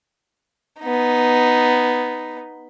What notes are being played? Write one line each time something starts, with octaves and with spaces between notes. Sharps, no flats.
B3 D#4